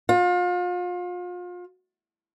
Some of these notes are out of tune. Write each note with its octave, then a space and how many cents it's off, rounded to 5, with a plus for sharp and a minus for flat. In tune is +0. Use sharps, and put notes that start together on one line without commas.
F4 +35